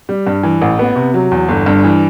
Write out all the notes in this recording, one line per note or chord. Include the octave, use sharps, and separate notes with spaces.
G3
G2
E3
A1
B3
C3
F#3
E2
G1
G2
E3